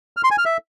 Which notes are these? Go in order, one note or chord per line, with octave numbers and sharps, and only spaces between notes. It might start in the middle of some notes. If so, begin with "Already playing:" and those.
F6
C6
G#5
F6
E5